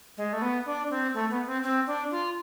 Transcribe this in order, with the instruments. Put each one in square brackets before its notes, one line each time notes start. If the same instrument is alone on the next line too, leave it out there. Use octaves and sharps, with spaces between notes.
[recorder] G#3
A3
B3
D4
C4
A3
B3
C4
C4
D4
F4